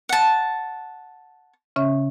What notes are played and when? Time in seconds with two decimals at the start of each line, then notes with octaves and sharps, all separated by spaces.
0.09 F#5 A5
1.76 C#3 C#4 E5